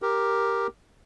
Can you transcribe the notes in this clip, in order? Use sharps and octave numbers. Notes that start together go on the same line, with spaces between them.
G4 A#4